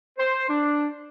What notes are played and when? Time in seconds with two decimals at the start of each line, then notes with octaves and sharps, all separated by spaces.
0.18 C5
0.48 D4